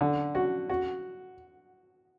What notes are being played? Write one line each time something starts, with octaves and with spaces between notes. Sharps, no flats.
D3
F#4
F#4